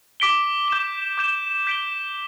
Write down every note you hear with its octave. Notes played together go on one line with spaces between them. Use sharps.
D6 B6 D7 G7
D6 G6 E7 G7
D6 G6 E7 G7
G6 B6 D7 G7